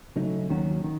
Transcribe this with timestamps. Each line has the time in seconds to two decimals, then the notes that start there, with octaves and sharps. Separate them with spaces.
0.16 C#3 F#3 A3 D#4
0.49 D#2 D#3 F#3 C#4 F#4
0.84 D#3